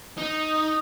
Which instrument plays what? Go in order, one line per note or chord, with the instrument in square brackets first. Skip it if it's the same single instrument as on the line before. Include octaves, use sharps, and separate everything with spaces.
[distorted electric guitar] D#4